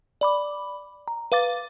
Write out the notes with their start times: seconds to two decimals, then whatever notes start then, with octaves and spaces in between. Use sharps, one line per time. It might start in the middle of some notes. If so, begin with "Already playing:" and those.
0.21 D5 B5 D6
1.08 A#5
1.32 B4 F5 D6 A6